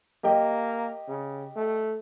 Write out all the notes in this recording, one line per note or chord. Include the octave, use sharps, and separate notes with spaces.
A#3 G4 D#5 G5
C#3
A3